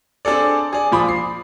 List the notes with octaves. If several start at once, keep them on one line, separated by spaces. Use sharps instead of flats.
C4 D4 G#4 A4 D5
G#4 D5
A#2 F3 B5 D6 D#6
C7